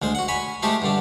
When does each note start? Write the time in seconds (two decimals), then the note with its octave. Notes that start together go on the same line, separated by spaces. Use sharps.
0.02 D2 G#3 C5
0.15 F#4 F#5
0.28 C#5 G#5 B5
0.62 G#3 A3 G4 A4 C5
0.82 G2 D3 D4